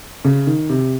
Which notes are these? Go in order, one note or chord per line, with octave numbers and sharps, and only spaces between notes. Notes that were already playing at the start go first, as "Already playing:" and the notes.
C#3
D#3
C3